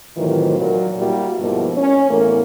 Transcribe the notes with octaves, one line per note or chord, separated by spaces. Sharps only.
A2 C3 D#3 E3 F#3 F4
A#2 F#3
G3 A#3 E4 F#4
G2 B2 F3 G#3 A#3 E4
C#4
E2 A2 A#3